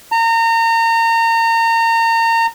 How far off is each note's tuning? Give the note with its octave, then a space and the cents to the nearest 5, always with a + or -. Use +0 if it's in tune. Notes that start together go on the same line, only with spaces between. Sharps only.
A#5 -30